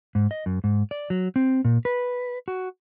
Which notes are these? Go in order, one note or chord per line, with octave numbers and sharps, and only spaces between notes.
G#2
D#5
F#2
G#2
D5
F#3
C4
A#2
B4
F#4